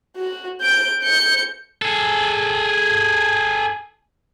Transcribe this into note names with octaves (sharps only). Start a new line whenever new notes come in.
F#4
G6 D7
G6 C#7
G#4 A4